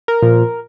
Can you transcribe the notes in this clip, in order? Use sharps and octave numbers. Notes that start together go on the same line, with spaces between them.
A#4
A#2 F3